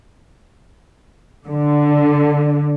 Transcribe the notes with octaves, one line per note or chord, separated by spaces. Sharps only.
D3